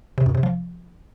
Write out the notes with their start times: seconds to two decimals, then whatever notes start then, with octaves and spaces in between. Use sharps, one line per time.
0.18 C3
0.26 F#2
0.35 C3
0.43 F3